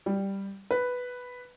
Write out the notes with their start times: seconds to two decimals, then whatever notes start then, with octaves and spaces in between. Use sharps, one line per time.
0.06 G3
0.71 B4